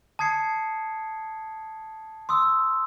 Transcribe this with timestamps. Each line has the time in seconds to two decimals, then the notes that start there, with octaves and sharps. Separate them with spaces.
0.19 A5 D#6 G#6 C7 C#7
2.29 C6 D#6 E6